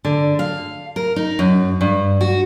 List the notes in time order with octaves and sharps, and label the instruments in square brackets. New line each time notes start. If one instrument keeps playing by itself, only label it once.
[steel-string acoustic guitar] D3
F5
A#4
D#4
F#2
G2
F#4